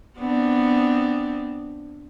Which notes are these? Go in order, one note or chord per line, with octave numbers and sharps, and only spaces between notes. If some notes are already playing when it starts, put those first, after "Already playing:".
B3 C4 D4